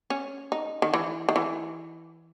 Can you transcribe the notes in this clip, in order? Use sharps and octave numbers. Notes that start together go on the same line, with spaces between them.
C#4
D#4
D#3
E3
D#3
E3